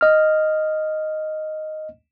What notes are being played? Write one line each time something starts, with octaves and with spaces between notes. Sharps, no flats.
D#5 F6